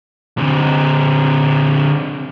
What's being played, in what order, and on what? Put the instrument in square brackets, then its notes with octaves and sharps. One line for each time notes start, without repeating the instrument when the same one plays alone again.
[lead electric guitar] D3 C4